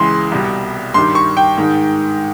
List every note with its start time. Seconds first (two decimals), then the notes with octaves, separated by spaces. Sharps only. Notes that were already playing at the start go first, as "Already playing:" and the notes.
Already playing: C#2 C#3 E3 G#3 C6
0.32 C2 B2 G3
0.94 G2 D#3 G3 C6
1.15 C#6
1.37 G5
1.57 G#2 D#3 G#3